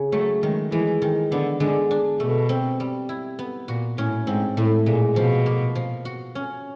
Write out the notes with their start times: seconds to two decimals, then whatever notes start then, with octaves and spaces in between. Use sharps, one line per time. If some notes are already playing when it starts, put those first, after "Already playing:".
Already playing: C#3
0.12 F#3 A3
0.42 D#3 G#3
0.72 E3 G#3
1.02 D#3
1.32 D3 B3
1.60 D3 G#3
1.91 D4
2.20 B2 A3
2.49 C4
2.80 G3
3.09 E4
3.39 B3
3.68 A#2 F#4
3.97 A2 C#4
4.27 G#2 C4
4.57 A2 A3
4.86 A#2 G#3
5.16 B2 F3
5.46 A#3
5.75 F3
6.05 F#4
6.35 C#4